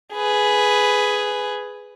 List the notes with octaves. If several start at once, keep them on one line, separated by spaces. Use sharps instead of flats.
G#4 B4